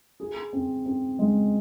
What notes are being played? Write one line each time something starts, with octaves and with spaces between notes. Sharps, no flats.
G#4
C4
C4
G#3